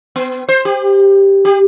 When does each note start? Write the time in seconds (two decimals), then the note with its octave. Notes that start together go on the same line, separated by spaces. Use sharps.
0.16 B3
0.49 C5
0.65 G4
1.45 G4